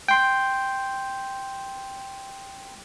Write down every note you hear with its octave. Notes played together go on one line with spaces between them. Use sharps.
G5 C6